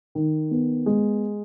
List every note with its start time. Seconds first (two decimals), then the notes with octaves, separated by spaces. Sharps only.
0.15 D#3
0.51 B3
0.86 G#3